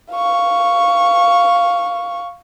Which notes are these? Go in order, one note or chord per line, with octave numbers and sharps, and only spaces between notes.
F5 C#6